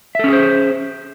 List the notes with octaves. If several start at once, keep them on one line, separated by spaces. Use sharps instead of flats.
C#4 G#4 A4 C5 E5